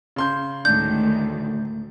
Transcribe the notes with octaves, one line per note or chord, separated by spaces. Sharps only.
C#3 C6 G6
D2 A2 D#3 G#3 D4 G6